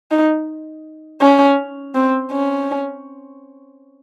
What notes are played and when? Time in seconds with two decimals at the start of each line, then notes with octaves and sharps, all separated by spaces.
0.11 D#4
1.21 C#4
1.95 C4
2.32 C#4